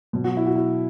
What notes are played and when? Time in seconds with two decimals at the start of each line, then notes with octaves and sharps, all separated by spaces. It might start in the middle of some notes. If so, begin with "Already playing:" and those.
0.13 B2 F#3
0.24 F#4
0.37 E4
0.46 F#4
0.56 E4